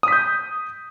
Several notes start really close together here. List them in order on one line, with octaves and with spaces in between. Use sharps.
D#6 B6 G6